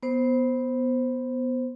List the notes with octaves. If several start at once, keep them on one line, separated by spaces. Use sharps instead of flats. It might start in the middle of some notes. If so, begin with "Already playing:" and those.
B3 C5